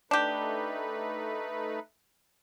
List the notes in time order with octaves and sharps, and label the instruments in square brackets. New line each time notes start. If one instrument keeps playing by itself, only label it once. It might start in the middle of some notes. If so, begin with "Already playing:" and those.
[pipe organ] A3 D#4 B4 [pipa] D4 G4